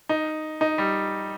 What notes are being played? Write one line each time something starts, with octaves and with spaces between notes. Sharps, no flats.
D#4
D#4
G3